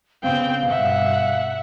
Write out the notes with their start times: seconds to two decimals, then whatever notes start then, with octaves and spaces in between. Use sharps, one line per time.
0.23 C#3 B3 C4 F5 G5
0.70 G2 B2 E5 F#5